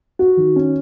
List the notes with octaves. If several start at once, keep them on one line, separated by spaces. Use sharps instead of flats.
F#4
D#3
C#4